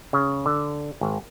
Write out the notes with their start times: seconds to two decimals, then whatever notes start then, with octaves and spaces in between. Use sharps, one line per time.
0.13 C#3
0.46 D3
1.01 G#1